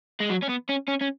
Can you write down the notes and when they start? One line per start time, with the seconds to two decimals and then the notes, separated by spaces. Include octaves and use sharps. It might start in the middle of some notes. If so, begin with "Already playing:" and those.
0.20 G#3
0.30 F#3
0.43 C#4
0.49 B3
0.69 C#4
0.88 C#4
1.01 C#4